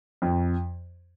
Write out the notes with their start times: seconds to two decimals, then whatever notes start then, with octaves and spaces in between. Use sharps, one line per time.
0.22 F2